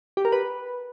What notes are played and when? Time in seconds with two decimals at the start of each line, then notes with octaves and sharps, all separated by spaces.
0.17 G4
0.25 A#4
0.32 B4